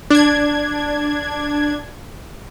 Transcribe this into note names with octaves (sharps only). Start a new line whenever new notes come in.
D4 G#6